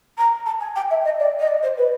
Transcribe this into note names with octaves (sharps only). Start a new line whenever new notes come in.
A#5
A5
G#5
G5
E5
D#5
D5
D#5
D5
C5
B4